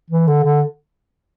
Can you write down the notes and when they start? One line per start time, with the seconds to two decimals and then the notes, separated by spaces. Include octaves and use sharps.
0.10 E3
0.27 D3
0.44 D3